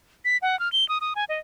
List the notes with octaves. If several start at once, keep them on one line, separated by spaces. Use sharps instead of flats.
B6
F#5
F6
G7
D#6
D#6
G#5
D#5